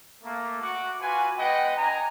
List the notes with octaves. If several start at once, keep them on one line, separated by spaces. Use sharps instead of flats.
A3 A#3
F#4 F#5 D6
F4 F#4 B4 G#5
G#3 B3 B4 D#5 F#5 G5
D4 D#5 G#5 A#5